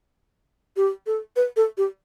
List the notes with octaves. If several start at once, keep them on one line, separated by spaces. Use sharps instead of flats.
G4
A4
B4
A4
G4